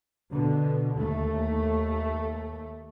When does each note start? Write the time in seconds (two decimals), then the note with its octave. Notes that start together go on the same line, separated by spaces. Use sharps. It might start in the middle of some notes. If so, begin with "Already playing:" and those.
0.33 B2 D3
0.96 D#2 A3